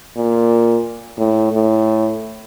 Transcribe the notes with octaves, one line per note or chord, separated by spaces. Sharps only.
A#2
A2
A2